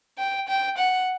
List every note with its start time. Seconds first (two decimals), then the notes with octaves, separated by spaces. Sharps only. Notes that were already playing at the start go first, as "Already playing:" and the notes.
0.18 G5
0.48 G5
0.78 F#5